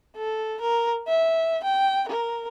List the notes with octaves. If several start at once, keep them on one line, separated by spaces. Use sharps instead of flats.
A4
A#4
E5
G5
A#4